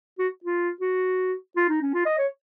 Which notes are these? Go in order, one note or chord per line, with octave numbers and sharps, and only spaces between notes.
F#4
F4
F#4
F4
D#4
C#4
F4
D#5
C#5